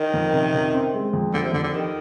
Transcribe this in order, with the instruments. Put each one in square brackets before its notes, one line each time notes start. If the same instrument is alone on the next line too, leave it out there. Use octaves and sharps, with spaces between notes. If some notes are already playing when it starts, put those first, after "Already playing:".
Already playing: [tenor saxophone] D#3
[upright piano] F2
C3
C3
C4
G#3
F2
[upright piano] F2 [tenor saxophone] D3
[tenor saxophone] C3
[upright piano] F2 [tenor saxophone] D3
[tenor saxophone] D3
[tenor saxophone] D#3 [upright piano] G4